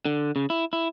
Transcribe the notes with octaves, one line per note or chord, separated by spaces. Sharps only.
D3
C#3
E4
E4